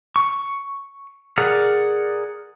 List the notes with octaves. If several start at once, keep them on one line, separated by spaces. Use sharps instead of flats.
C#6
G#4 A#4 D5 F#5